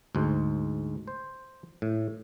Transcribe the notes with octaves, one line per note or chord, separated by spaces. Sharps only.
D2 G#2
C5
A2